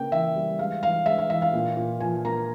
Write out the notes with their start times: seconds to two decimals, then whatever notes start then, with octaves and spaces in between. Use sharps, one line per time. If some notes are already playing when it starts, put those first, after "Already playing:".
Already playing: C#3 A#3 G5
0.12 E3 E5
0.36 G3
0.59 G#3 F5
0.82 E3 F5
1.06 G#3 E5
1.18 F5
1.30 E3 E5
1.42 F5
1.53 A#2
1.77 A#2
2.00 F3 G#5
2.25 A#3 A#5